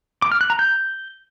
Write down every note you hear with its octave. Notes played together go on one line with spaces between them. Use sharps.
D6
F6
F#6
A#5
G6